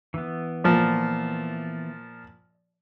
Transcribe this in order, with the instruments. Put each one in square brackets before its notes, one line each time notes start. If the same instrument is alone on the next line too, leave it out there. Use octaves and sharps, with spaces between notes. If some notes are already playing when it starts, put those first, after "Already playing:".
[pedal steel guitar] E3 B3
[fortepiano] A#2 F3